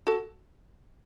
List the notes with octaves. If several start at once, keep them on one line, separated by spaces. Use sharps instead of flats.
F#4 A4